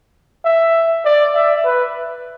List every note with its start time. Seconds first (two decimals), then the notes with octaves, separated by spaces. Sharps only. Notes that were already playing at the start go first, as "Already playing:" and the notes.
0.45 E5
1.05 D5
1.35 E5
1.65 B4